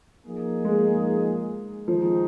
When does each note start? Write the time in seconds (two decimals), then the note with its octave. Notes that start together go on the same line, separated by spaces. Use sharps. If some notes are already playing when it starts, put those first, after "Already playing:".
0.23 F3 A#3 D#4 G#4
0.65 G#3
1.87 D#3 F3 G#3 C4 D#4